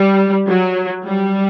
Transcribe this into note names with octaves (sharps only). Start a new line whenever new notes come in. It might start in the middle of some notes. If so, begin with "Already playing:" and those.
Already playing: G3
F#3
G3